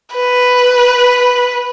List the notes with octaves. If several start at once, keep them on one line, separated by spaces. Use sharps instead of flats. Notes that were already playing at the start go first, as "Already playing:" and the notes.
B4